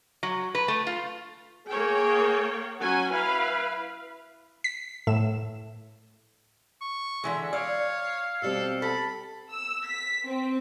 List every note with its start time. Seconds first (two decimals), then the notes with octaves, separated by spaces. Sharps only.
0.23 F#3
0.55 B4
0.68 A3
0.87 F4
1.67 A#3 G#4 C#5 G5
2.79 F#3 C#4 F#5 G#5
3.11 E4 B4 F5
4.64 B6
5.07 A2 E5 E7
6.81 C#6
7.24 D3 E3 G#3 E5
7.53 C#5 D5 F5
8.42 B2 G3 C4 A4
8.82 A4 B5
9.51 E6
9.86 B6
10.25 C4